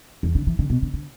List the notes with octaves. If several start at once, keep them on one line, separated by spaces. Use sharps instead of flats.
E2
D3
E3
D3
B2
D3
D3